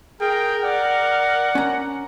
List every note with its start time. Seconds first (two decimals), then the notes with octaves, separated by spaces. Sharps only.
0.21 G#4 A#4 G5
0.63 D5 F#5
1.55 C#4 A#5